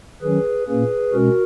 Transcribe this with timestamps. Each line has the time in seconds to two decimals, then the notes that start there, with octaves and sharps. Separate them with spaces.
0.22 D#3 F#3 C#4 G#4 B4
0.67 A#2 A#3 C#4 G#4 B4
1.13 B2 G#3 C#4 F#4 A#4